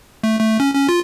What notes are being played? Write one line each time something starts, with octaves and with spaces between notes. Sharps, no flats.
A3
A3
C#4
C#4
F4